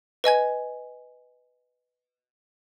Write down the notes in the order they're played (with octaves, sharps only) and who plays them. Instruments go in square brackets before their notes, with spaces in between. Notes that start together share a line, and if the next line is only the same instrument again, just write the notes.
[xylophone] B4 D#5 G#5 G#6